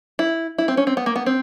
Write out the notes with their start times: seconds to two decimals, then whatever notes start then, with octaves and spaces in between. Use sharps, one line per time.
0.19 E4
0.58 E4
0.68 C4
0.77 C#4
0.87 C4
0.97 B3
1.06 A#3
1.16 B3
1.26 C4